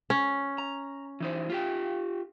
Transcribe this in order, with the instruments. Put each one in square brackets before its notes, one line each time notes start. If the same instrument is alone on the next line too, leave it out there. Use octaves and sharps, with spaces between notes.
[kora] C#4
[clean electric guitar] A#5
E3 D#4 C5
F4 G4 G5